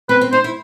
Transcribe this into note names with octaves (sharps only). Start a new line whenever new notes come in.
C4 B4
C4
D#4 C5
E4